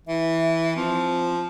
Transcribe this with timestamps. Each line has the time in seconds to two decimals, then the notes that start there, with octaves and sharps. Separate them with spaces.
0.08 E3 E5
0.76 F3 C4